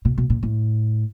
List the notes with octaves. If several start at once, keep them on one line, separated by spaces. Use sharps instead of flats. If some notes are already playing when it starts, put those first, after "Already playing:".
B2
B2
A#2
A2